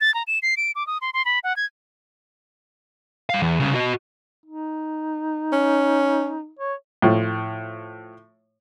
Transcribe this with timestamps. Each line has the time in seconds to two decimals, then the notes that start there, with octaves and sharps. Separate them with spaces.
0.01 A6
0.14 A#5
0.27 E7
0.43 C7
0.57 D7
0.75 D6
0.87 D#6
1.01 C6
1.14 C6
1.25 B5
1.44 F#5
1.57 G#6
3.30 G3 F5
3.41 E2
3.60 C2 C#3
3.74 F#4 D#5
4.46 D#4
5.52 C#4
6.59 C#5
7.02 A2 F3